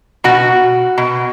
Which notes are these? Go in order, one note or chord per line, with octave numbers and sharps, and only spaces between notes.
B2 F#4
B2